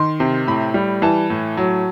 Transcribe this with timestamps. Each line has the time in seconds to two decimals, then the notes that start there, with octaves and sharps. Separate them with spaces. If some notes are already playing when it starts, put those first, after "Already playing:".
Already playing: D#3 C6
0.20 C3
0.47 A2 B5
0.74 G3
1.02 E3 A5
1.30 A2
1.57 F#3